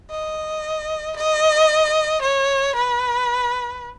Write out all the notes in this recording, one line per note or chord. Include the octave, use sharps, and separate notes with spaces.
D#5
D#5
C#5
B4